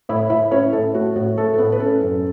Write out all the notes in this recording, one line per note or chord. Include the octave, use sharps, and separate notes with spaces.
A2 E4 E5
A2 E4 E5
C#4 E4 C#5
A2 A4
A3 F#4
A2 F#4
A3 A4
A4
A2 B3 B4
B4
C#4 A4
F#2